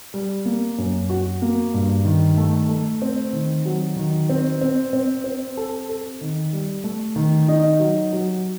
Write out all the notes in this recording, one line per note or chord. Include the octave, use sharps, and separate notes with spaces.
G3
A#3
F#2
F#4
A#3
G2
D#3
A3
A3
C4
D#3
F#3
D#3
C4
C4
C4
C4
A4
A4
D#3
G3
A3
D#3
D#4
F#3
F#3